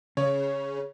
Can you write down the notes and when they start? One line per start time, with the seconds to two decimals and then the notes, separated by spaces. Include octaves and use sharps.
0.17 C#3 C#4 C#5